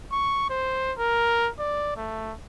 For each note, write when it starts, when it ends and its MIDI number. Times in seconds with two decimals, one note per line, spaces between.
0.12 0.46 85
0.50 0.92 72
0.98 1.50 70
1.59 1.93 74
1.97 2.33 57